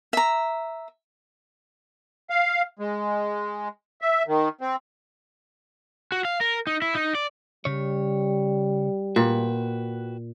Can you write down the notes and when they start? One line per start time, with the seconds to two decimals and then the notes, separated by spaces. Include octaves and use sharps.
0.13 E5 A#5
2.30 F5
2.79 G#3
4.02 E5
4.27 D#3
4.61 C4
6.12 F#4
6.25 F5
6.41 A#4
6.67 D#4
6.82 E4
6.95 D#4
7.15 D5
7.65 C#3 G3 C#5
9.16 A#2 F#4 B4 G5